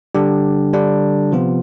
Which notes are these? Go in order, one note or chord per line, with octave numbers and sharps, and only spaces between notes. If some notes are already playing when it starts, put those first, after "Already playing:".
D3 G3 D4 G4
D3 G3 D4
C3 F3 B3 F4